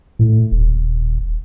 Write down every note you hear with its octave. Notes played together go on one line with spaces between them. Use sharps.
A2
D#1